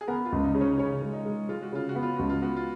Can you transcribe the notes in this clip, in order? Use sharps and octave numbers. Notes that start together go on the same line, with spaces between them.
G#4
B3 A#4
F4
C#2
D#4
C#3 D#4
C#4
C#3 C#4
G#3
D#4
G#3
G#3 F4
F#4
C#3 F4
F#4
B3
F4
C#2 F#4
F4
B3 F#4
F4